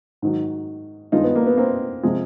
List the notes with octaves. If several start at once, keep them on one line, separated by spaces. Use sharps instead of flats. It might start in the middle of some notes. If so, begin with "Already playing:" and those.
G#2 D#3 F#3
G2 D#3 G#3 D#4 F4
B3
A#3
B3
A#3 C4
C3 F3 G#3